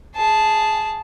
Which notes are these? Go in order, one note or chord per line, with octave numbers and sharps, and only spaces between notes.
G#4 A5